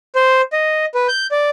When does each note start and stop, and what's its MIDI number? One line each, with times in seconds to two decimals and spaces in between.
0.16 0.41 72
0.53 0.85 75
0.95 1.07 71
1.08 1.27 91
1.32 1.50 74